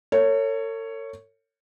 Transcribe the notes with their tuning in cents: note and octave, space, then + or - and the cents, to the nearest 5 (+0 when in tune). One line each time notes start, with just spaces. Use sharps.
A4 +45 C#5 +0